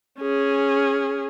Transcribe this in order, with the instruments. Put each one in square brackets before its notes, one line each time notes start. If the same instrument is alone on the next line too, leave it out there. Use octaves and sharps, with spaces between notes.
[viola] C#4 G#4